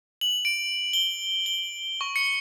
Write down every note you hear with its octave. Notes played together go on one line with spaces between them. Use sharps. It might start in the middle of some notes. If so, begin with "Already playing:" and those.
F#7
D7
G7
G7
C#6
C#7